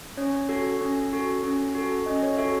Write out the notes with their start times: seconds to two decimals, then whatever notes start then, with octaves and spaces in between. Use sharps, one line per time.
0.17 C#4 C#5
0.49 F#4 A4
0.81 C#4
1.13 F#4 A4
1.44 C#4
1.75 F#4 A4
2.06 C#4 D#5
2.23 C#5
2.38 F#4 A4 E5